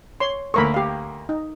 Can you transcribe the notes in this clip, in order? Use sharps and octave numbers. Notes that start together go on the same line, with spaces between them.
C#5 C6
D2 A#3 A4 A#4 B5 C#6
G4 F5
D#4